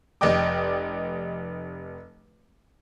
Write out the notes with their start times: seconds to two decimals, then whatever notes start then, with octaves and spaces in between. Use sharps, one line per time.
0.21 F1 D5 D#5 G5 D6